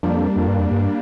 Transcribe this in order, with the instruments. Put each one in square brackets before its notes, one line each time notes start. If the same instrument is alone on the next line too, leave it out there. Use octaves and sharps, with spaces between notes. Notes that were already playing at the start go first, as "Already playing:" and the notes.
[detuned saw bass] F2 [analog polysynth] G3 A#3 D4
[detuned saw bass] F2
G2
F2
G2